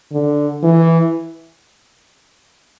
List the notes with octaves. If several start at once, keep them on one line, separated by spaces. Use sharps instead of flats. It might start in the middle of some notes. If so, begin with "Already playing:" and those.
D3
E3